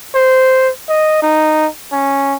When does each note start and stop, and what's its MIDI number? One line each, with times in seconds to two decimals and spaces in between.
0.15 0.70 72
0.89 1.22 75
1.22 1.67 63
1.92 2.36 61